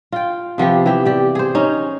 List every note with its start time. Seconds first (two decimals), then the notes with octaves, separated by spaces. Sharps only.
0.12 F4 G5
0.58 C3 F3 B3 G4
0.86 E3 G4 E5
1.05 G4 D5
1.35 G#4 C5
1.55 C#4 D#4